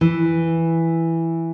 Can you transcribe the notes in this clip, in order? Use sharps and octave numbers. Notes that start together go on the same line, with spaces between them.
E3